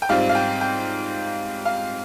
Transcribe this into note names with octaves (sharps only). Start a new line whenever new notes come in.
G5
G#2 G3 C4 F4 F5
F5
G5
G5
F5